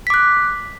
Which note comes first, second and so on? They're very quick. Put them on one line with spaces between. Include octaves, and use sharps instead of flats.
B6 D6 F#6